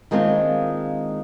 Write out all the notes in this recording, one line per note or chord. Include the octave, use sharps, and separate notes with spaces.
D#3 G#3 A#3 C4 D4 F4